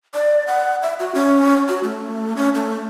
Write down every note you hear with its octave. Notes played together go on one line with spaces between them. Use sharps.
D5
F#5
E5
F#4
C#4
F#4
A3
C#4
A3